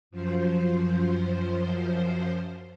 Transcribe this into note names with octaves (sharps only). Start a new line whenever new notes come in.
F#2 F3 C5